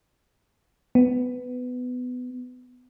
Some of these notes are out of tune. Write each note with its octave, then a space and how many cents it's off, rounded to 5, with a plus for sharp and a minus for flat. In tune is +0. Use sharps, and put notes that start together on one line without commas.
B3 +15